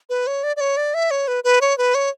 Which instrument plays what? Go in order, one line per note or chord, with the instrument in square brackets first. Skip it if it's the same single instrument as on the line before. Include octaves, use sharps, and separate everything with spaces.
[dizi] B4
C#5
D5
D5
C#5
D5
E5
C#5
B4
B4
C#5
B4
C#5